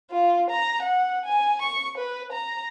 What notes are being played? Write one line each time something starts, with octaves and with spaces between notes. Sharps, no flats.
F4
A#5
F#5
G#5
C#6
B4
A#5